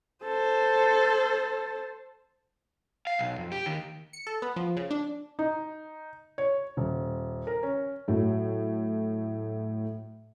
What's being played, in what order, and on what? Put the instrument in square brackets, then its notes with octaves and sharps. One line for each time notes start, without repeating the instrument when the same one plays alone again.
[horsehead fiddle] A4 C5
[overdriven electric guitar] F5
B1
F2
G4
D#2 D#3
[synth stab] C#7
A4
B3
F3
C#3
D4
[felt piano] D#4
C#5
D#1
A#4
C#4
A2 F#3